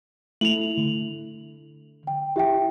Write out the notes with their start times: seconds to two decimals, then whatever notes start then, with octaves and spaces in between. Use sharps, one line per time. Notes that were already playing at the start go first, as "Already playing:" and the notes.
0.41 A3 E4 F7 F#7
0.77 D3
2.07 G5
2.36 E4 G4 E5 G5